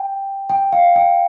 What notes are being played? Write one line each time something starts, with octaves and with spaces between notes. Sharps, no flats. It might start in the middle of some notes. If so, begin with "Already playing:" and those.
Already playing: G5
G5
F5
G5